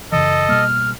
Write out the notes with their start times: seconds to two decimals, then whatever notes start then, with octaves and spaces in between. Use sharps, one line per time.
0.12 F#2 C#3 E3 A4 D#5
0.49 B2 G3 A#3 F6